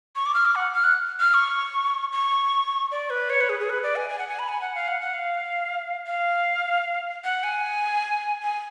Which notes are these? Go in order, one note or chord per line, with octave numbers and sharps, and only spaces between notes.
C#6
D6
F6
D6
F#5
F6
F#6
F6
C#6
C#6
D5
B4
C#5
B4
G#4
G#4
B4
D5
G#5
G#5
F#5
G#5
B5
G#5
F#5
F5
F#5
F#5
F5
F5
F#5
G#5
G#5